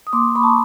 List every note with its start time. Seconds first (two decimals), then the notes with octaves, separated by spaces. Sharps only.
0.07 D#6
0.13 A#3 C6 D6
0.35 B5 C#6
0.43 A5
0.49 A#5